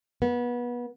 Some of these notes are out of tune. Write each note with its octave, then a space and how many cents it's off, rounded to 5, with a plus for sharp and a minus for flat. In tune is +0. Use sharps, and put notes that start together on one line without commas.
B3 -25